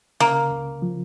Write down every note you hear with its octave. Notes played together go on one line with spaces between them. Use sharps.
C#3 A#3
C#2
F3